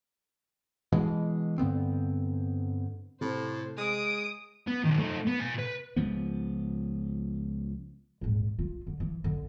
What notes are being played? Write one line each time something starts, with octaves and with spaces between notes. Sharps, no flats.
B2 E3 G#3
G2 D3 B3 C4
A2 C3 C5
G#3 D#6 D7
B3
B1 D#3
A3 D#4
B3
B2 G#5
B4
C#2 F3 B3
D#1 G#1
F4
D3
E3
F2 D3